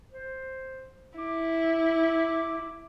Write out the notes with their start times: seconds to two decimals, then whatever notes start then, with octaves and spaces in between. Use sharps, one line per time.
0.12 C5
1.19 E4 D6